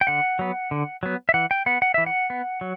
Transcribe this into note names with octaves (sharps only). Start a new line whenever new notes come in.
G5
D3 F#5
F#3 B3
D3
F#3 B3
E5
E3 F#5
G5
B3 F#5
F#5
E3 E5
F#5
B3
F#3